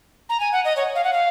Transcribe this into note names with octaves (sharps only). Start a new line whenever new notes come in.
A#5
G#5
F#5
D#5
C#5
F5
F#5
F5